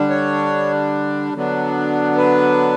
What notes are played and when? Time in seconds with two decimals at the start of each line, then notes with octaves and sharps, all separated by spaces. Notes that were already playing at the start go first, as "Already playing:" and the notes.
Already playing: D3 G3 D4
0.10 C#5
1.34 D3 F#3 B3 D4
2.17 B4